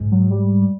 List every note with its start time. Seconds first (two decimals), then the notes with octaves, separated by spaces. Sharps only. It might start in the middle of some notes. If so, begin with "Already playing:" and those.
Already playing: G#2
0.12 F#3
0.31 G3